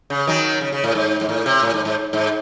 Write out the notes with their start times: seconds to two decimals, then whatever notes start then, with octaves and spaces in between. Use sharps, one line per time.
0.10 C#3
0.27 D#3 F#3
0.61 C#3
0.72 C#3
0.84 A2
0.95 G#2
1.21 G#2
1.29 A2
1.46 C3
1.62 A2
1.74 G#2
1.85 G#2
2.13 G#2